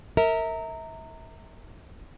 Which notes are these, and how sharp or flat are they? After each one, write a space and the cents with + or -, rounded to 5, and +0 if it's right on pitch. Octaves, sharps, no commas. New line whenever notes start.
A#4 -20 E5 -30